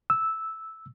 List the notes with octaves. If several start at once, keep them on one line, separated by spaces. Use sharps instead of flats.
E6